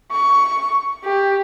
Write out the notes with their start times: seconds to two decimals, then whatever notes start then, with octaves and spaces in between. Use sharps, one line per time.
0.11 C#6
1.04 G4